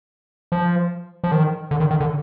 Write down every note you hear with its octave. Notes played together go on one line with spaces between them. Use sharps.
F3
F3
D#3
D3
D#3
D#3
D3